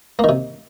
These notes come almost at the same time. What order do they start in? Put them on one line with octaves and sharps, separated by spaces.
A#3 D#3 C3